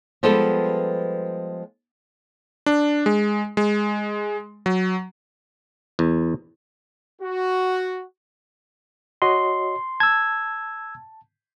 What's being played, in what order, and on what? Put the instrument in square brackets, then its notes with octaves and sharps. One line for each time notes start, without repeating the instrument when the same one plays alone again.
[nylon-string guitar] F3 G3 G#3 B3 A4 B4
[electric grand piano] D4
G#3
G#3
F#3
[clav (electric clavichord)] E2
[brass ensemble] F#4
[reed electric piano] F#4 C#5 D#5 [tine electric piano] C6
[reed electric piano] A5 [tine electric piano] E6 G#6